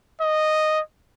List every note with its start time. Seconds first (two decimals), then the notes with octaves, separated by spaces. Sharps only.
0.22 D#5